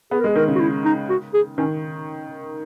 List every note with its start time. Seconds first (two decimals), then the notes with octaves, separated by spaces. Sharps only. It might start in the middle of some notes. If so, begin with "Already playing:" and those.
0.11 B3 G#4
0.20 A#4
0.24 G#3
0.27 G#4
0.36 D#3 A#4
0.48 C#3
0.55 F#4
0.60 E4
0.85 D#4
1.09 F#4
1.34 G#4
1.58 D#3 C#4